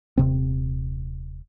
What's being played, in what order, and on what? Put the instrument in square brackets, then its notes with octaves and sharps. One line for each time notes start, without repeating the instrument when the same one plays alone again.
[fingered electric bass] D#1 C3 C4